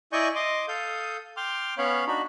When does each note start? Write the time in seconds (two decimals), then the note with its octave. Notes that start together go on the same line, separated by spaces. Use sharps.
0.13 E4 D5 D#5 G#5 C#6 G6
0.35 D#5 C6 D6
0.68 A4 F5 D#6 G6
1.37 G5 C6 D6 F6
1.78 B3 C#4 C#5 F5 B5
2.07 D4 D#4 F#4 B5